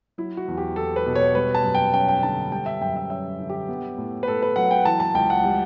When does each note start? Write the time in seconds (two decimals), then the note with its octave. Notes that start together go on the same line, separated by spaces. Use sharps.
0.18 F#3 E4
0.37 F#4
0.48 E2
0.57 G4
0.76 E2 A4
0.96 B4
1.06 B2
1.15 C#5
1.35 G3 B4
1.54 A5
1.64 F#2
1.75 G5
1.93 C#4 G5
2.08 G5
2.23 D3 A5
2.52 G3 G5
2.66 E5
2.81 F#2 G5
2.96 E5
3.10 C#4 E5
3.39 D3
3.49 G4
3.68 B3
3.98 A2
4.23 B4
4.27 A2 A4
4.42 B4
4.56 F#3 F#5
4.71 G5
4.85 E3 A5
5.00 A5
5.14 C#2 G5
5.30 F#5
5.44 G3